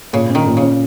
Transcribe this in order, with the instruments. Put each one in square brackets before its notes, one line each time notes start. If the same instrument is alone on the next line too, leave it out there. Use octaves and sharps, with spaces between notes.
[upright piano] A#2 [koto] C#3
[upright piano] C#4
[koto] D#3
[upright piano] A#2
[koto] C#3
[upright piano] C#4